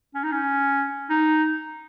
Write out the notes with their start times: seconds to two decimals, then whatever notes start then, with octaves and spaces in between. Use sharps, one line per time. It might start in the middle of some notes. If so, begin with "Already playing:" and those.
0.14 C#4
0.24 D#4
0.32 C#4
1.10 D#4